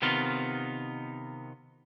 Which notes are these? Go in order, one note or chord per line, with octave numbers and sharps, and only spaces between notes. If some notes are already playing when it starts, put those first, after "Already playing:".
C3 D#3 B3 D#4 F4